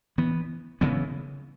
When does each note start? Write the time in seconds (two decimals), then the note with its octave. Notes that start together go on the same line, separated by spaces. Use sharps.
0.18 E3 B3
0.81 C#3 E3 B3